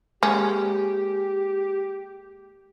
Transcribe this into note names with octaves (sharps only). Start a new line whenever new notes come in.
G#3 A#3 C#4 G4